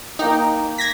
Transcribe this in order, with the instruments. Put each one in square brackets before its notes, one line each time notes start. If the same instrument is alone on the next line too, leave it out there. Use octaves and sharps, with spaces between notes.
[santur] A#3 G5 [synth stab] D#4
[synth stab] G#6 A#6 B6